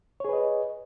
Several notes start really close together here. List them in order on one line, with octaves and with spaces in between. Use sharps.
C#5 G#4 B4 D#5